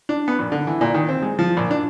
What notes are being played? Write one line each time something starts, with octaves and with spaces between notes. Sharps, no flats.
D4
B3
A#1
D3
E3
A#2
D#3
C4
G#3
F3
A#1
D4